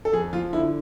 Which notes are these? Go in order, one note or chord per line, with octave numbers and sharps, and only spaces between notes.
A4
F2 G#4
F3 F4
D3 E4